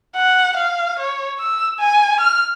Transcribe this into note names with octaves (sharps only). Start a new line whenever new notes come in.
F#5
F5
C#5
E6
G#5
F6